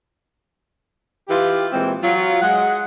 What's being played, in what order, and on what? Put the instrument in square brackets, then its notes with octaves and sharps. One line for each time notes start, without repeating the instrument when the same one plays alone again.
[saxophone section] E3 F4 G4
A#2 E3 G#3 C4
F#3 F4
G#3 F#5